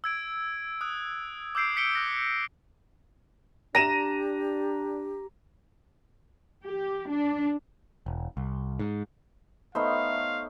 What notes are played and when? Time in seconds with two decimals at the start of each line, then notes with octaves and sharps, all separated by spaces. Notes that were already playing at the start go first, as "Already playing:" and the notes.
0.04 E6 G#6 D7
0.81 D#6 F#6
1.55 D6 E6 G6 C7 D7
1.77 B6 C#7 D7 G7
1.95 F#6 A#6
3.75 D4 G4 A#5 A#6 D#7 E7
6.64 G4
7.10 D4
8.06 E1
8.37 C2
8.79 G#2
9.75 A3 B3 D#4 C5 C#5 E5 F5